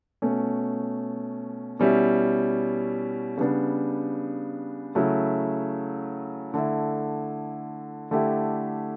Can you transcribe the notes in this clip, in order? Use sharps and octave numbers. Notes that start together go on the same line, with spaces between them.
B2 A3 C#4
B2 G3 C#4 E4
C#3 G3 B3 D4
C#3 F#3 A3 E4
D3 A3 E4
D3 A3 E4 G4